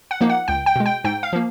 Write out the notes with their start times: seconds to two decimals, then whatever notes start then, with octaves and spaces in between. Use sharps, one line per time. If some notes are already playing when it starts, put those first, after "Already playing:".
0.11 F#5
0.21 F3 A#3 D#4
0.30 F#5
0.48 C#2 G5
0.66 G5
0.76 B2 G#3
0.86 G5
1.04 G#2 G5
1.23 F5
1.33 F3 A#3